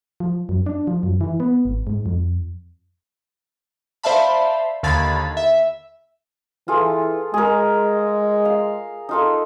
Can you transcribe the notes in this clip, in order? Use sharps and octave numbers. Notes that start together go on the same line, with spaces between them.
F3
F#2
D4
F3
F#2
E3
B3
G#1
G#2
F2
C5 D5 E5 F5 A5 B5
D#2 D3 F5 B5 G#6 A6
E5
E3 F4 G#4 A4
G#3 G#4 A#4
F5
D#4 F4 A4